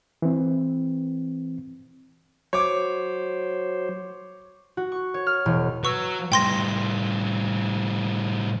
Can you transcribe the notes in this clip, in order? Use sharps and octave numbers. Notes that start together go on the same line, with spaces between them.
E3 C4
F#3 C5 C#5 D6
F#4
C#6
C#5
F6
E1
F#3 B4 C#6 E6
A2 G3 G5 C6 A#6